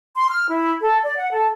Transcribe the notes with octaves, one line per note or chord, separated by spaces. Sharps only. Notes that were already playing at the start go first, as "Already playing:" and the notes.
C6
F6
E4
A4
D5
F#5
A4